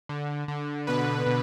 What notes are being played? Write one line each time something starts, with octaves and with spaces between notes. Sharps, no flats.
D3
D3
B2 B4
B2